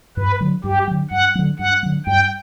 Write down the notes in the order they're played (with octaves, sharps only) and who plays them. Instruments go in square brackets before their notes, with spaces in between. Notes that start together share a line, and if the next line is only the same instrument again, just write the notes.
[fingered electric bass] G2 [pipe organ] B4
[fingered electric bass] D3 F#3
[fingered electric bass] G2 [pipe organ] G4
[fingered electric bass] D3 F#3
[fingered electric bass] G2 [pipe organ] F#5
[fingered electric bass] D3 F#3
[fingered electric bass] G2 [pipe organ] F#5
[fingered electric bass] D3 F#3
[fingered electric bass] G2 [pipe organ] G5